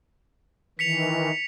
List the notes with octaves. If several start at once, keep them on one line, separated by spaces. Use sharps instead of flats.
D#3 E3 B6 C#7 F7